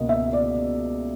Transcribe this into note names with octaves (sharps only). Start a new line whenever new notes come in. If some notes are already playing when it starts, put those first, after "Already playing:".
Already playing: C#2 B2 A#3 D#5
E5
D5